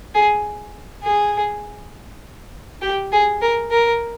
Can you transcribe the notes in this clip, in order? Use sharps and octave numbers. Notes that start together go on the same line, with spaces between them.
G#4
G#4
G4
G#4
A#4
A#4